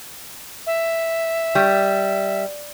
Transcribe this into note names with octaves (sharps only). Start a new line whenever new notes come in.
E5
G3